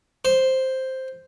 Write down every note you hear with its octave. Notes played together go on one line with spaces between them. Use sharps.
C5